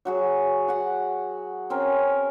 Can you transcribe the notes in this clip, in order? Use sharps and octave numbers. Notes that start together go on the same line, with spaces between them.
F#3 F#4 G#4
F#4 F#5
C4 C#4 A#4